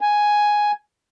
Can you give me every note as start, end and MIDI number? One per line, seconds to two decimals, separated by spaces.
0.01 0.72 80